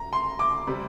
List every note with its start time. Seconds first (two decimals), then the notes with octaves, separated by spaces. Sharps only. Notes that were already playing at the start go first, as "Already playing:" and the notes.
Already playing: A#5
0.13 C6
0.39 D6
0.67 C3 G3